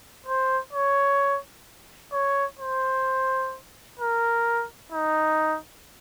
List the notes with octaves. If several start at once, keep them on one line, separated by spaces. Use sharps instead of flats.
C5
C#5
C#5
C5
A#4
D#4